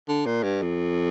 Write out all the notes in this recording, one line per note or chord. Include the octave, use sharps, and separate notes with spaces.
D3
A#2
G2
F2